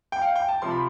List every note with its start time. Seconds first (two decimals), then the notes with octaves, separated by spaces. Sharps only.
0.12 G5
0.21 F5
0.36 G5
0.48 A5
0.62 C3 F3 C6
0.71 B5